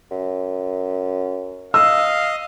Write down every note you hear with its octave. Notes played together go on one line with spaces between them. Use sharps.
F#2
D#5 F5 E6